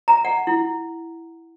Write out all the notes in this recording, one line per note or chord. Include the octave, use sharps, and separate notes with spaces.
A#5
F#5
E4